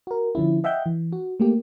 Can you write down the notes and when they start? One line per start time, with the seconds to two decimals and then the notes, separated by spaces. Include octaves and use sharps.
0.07 F#4 A#4
0.35 D3 F3 C#4 E4
0.64 D#5 E5 F#5 G5 G6
0.86 E3
1.12 F#4
1.40 A3 A#3 G4